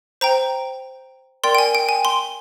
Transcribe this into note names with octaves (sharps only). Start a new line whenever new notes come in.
C5 G5 A#5
A#4 D5 G5 C6
G5
G#5
G5
G#5
C6